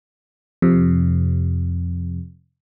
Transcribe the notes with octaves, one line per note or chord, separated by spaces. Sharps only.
F2 C3